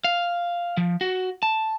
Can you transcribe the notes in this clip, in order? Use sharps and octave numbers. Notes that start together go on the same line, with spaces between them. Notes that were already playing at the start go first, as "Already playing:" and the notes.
F5
F3
F#4
A5